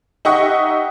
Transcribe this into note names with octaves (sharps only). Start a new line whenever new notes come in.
D#4 G4 E5 F#5 C#6 D#6